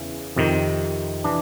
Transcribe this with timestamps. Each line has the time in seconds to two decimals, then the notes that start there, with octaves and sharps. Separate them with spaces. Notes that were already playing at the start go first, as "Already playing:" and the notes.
Already playing: E2 C#3 E3
0.37 F2 C3 D#3
1.24 E3 D4